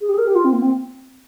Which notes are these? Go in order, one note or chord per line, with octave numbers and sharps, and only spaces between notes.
G#4
G4
G#4
A#4
G4
F4
C4
A#3
C4